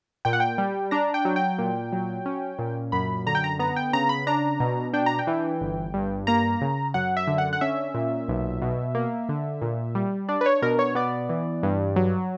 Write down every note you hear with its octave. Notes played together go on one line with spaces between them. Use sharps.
A#2 G5
F#5
G5
G3
D4 A#5
G5
F#3
G5
A#2
F#3
C#4
A#2
F#2 B5
D3 A#5
G5
A#5
B3 A#5
G5
C#3 A#5
B5
D4 A#5
B2
D4 G5
A#5
G5
E3
G1
G2
A#3 A#5
C#3
F#2 F#5
E5
D3
F#5
F#5
C#4 E5
A#2
B1
B2
A#3
D3
A#2
G3
D4 D5
B4
C#5
B2 A#4
C#5
B3 D5
E3
G2
F#3